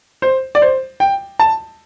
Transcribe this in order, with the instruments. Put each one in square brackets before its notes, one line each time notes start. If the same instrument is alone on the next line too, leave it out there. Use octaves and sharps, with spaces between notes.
[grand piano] C5
D5
C5
G5
A5